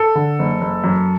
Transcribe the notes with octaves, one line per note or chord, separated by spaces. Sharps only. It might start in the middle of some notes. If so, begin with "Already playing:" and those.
Already playing: A4
D3
F#1
F#1
F#2